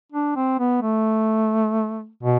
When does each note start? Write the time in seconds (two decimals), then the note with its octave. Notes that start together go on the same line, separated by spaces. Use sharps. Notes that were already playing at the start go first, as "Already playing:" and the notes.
0.12 D4
0.36 C4
0.59 B3
0.82 A3
2.23 B2